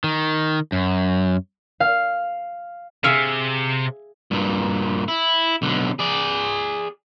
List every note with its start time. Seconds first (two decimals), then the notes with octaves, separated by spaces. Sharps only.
0.04 D#3
0.72 F#2
1.80 F5
3.04 C3 G#4 E5 F5
4.31 G2 A#2
5.08 E4
5.62 B1 D3
5.99 G#4 D5